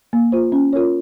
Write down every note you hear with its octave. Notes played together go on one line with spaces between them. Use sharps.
A#3
F4 C5
C#4
F4 A#4 C#5